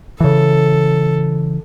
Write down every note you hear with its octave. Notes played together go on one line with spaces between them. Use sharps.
C#3 E3 A4